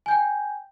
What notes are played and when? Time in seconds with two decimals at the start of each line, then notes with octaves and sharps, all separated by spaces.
0.06 G#5
0.08 G6
0.11 G5